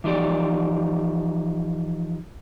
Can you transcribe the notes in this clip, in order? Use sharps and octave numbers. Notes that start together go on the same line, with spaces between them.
E3 F3 D#4 G4 D5